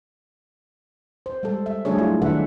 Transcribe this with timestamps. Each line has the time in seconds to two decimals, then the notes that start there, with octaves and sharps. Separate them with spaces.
1.26 C5
1.43 G3 G#3 A4
1.66 E5
1.85 F#3 G3 A3 D4 G#4 C#5
1.98 A3 E4 F4
2.22 D#3 D4 A4 B4 E5 F#5